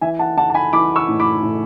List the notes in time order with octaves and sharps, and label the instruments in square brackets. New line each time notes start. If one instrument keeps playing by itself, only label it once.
[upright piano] E3 E5 G#5
F#5 A5
E3 F#5 A5
A5
G#5 B5
E3 B5 D6
C#6 E6
A2
B5 D6
A2